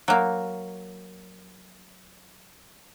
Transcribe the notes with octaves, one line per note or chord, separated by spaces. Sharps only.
F#3 A#3